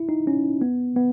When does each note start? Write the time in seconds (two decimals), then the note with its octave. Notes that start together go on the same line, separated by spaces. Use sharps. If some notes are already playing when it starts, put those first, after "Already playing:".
Already playing: E4
0.09 D#4
0.27 C#4
0.61 B3
0.96 B3